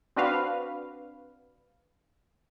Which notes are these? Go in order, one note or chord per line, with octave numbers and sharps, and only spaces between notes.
C4 D4 F#4 B4 F5